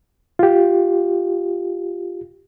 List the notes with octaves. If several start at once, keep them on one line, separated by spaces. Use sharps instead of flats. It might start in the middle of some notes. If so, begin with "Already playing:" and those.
F4 G4